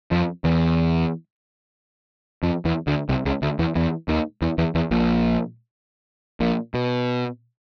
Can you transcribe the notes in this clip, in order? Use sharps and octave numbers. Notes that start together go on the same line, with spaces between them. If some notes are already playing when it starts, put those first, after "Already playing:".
F2 F3
E2 E3
F2 F3
E2 E3
D2 D3
C2 C3
C#2 C#3
D2 D3
E2 E3
E2 E3
D#2 D#3
E2 E3
E2 E3
E2 E3
A#1 A#2
A#1 A#2
B2